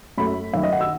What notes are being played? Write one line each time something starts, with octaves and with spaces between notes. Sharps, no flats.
F#2 F#3 A3 B5
F#2 D#3 A3 E5
D#5
F#5
E6